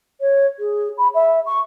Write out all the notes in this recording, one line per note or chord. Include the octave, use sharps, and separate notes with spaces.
C#5
G#4
B5
E5
C#6